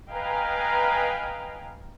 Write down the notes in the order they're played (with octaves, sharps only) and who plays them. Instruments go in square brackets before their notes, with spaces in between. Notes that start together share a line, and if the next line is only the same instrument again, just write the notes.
[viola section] B4 D#5 F5 G5 G#5 A#5